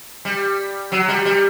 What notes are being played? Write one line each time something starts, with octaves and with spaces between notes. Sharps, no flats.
G3
F#3
G3
G3